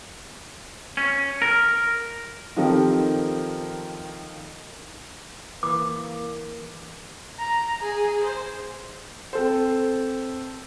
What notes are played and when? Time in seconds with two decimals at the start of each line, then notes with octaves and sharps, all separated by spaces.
0.97 C#4
1.42 A#4
2.56 D#3 F3 C4 G4 A4 A#4
5.63 E3 A#3 D6
7.38 A#5
7.82 G#4
8.24 C5
9.33 C4 A4 C5